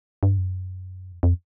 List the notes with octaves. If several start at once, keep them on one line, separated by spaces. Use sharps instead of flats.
G2
F#2
F2
F2